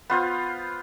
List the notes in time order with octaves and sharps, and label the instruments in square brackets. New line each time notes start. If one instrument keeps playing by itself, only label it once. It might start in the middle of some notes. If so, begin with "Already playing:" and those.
[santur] B3 F4 C5 F5